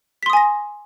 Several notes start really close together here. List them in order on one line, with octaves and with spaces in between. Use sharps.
B6 C6 D#6 G#5 A#6